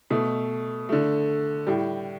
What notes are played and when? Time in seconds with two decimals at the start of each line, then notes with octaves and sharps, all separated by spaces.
0.10 B2 A3
0.89 D3 A3
1.67 A2 G3